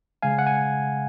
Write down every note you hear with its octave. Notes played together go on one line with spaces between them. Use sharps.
C#3 G#3 F5 G#5
F#5
G#5